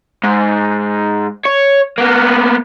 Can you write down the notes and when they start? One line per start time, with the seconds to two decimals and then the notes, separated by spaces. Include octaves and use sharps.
0.23 G#2
1.46 C#5
1.98 A#3 B3